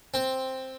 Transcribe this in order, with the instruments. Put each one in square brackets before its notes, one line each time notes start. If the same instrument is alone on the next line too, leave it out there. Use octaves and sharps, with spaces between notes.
[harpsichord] C4